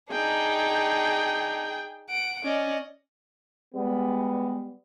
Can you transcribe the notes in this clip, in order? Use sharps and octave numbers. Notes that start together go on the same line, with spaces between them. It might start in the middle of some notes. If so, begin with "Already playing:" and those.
D4 D#4 G#4 G5
F#5 D7
C#4 D5 D#5
G3 G#3 B3